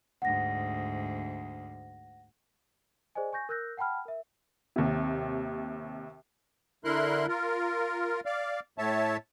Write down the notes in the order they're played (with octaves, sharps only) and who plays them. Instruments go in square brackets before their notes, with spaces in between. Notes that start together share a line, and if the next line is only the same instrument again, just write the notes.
[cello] D2 G#2 [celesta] F#5 A#6
[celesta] G#4 C5 D5 D#5 G#5
G#5 C#6 G6 A#6
A#4 E6 F#6 G6 A#6
F#5 G5 A5 B5 F6
A#4 E5
[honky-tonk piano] D#2 C3
[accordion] D3 E4 A#4 C6 F#6
F4 A#4
D5 F5
A2 C#5 E5 A5